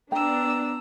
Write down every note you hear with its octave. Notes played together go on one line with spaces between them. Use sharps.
B3 D4 G5 A#5 E6